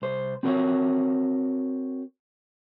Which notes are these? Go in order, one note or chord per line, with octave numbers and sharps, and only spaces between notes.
C2 C5
C4 F#4 A#4 C#5